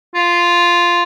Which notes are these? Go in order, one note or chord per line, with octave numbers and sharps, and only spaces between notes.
F4